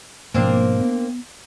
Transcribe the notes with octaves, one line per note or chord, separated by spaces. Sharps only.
G#2 B2 F3 A#3 C4 D4
B3